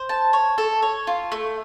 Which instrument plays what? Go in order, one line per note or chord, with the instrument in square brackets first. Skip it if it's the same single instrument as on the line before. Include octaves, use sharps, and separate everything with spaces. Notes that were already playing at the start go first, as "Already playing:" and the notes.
Already playing: [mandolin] C5
A5
C#5
A4
C#5
F4
A3